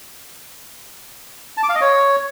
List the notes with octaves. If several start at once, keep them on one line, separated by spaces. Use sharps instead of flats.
A5
D6
F5
D#5
C#5